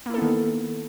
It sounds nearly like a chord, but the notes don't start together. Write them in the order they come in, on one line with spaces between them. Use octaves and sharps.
A#3 E4 A4 B3 D#3